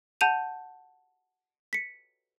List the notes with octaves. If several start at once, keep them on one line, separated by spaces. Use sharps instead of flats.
F#5 A5 G6 D#7 F7
B6 C#7